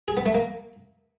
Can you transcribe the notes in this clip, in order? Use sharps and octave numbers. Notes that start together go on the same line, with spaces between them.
G#4
B3
A3
A#3